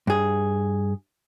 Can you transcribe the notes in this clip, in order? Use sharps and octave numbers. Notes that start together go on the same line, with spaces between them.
G2 G#4